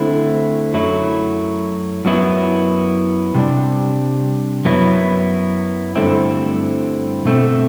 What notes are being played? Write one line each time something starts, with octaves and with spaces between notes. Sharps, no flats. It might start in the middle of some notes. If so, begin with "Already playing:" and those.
Already playing: D3 A3 C4 E4
F#2 F#3 A3 E4
F#2 F#3 B3 E4
C3 G3 D4
F#2 F#3 B3 E4
G2 D3 A3 C4 E4
B2 A3 C4